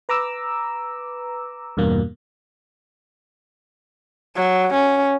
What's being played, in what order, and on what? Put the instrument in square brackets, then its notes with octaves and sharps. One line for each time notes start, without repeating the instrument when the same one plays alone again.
[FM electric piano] B4 A#5 D6 E6
E2 G2 B2 A#3
[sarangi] F#3
C#4